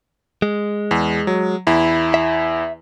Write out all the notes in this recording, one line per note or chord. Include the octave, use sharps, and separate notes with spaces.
G#3
E2
F#3
E2 E4
E5